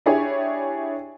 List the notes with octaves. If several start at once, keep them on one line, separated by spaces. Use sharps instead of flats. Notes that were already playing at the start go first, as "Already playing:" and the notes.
D4 E4 G4 G#4 C#5